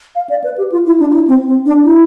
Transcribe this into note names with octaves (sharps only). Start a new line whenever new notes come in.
F5
D5
B4
G4
F4
E4
D4
F4
E4
C4
C4
D4
E4